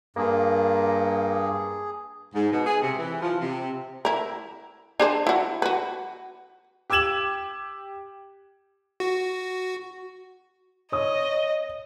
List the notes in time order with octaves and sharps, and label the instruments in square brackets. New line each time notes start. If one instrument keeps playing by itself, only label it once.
[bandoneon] G2 [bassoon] A#3 [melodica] G#4
[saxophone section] G#2
B2
G#4
C3
E3
F3
C3
[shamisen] E4 A#4
D4 G#4 C5
E4 F#4
F#4 B4
[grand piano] G4 D6 E6 G#6 E7 F#7
[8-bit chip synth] F#4
[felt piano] C#5 D#6 [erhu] D#5